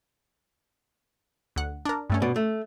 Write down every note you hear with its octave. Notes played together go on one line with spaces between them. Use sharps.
D2 F#5
D4 A#4
G2 A3 C#4
B2 D5
A3